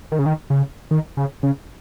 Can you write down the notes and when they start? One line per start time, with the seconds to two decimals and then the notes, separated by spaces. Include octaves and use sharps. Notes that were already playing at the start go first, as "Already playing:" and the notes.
0.12 D#3
0.19 C#3
0.26 D#3
0.50 C#3
0.91 D#3
1.17 C#3
1.43 C#3